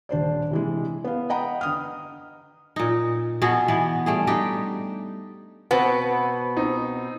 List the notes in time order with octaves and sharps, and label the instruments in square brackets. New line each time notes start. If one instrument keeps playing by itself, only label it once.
[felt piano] D#1 D4 C5 D5
C3 E3 G#3
B3 F5
D#5 F#5 G5 A#5 B5
D3 D#6 F6
[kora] A#2 D#4
B2 B3 F#4 G#4
E3 B3 B4
G3 A3 G#4
D4 D#4 G4 B4
[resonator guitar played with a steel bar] B2 B3 [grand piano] C4
[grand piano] C4 D#4